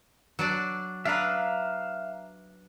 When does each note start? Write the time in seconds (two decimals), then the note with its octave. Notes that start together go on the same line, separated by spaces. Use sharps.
0.39 F#3 D4 D5
1.05 D4 B4 E5 F5 A#5